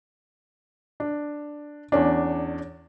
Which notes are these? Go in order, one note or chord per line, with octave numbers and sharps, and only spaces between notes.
D4
E2 C#4 D4